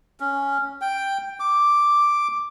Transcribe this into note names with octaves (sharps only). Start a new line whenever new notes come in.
C#4
G5
D6